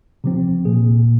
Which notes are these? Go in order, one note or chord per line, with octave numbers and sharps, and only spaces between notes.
C3 F3 C4
A#2 A#3 G#4